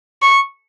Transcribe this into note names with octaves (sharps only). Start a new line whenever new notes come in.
C#6